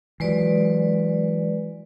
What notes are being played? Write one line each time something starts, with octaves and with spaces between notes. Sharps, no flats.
E3 F#3 G#3 B4 D5